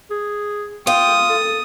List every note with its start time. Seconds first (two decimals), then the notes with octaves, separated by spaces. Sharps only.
0.10 G#4
0.87 F4 G5 D#6
1.29 A4